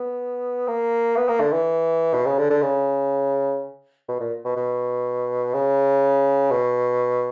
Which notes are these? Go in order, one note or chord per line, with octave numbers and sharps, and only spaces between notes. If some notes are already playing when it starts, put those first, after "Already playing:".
Already playing: B3
A#3
B3
A#3
D3
E3
B2
C#3
D3
D3
C#3
B2
A#2
B2
B2
C#3
B2